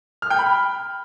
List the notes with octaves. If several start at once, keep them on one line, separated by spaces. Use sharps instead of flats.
F6
G5
B5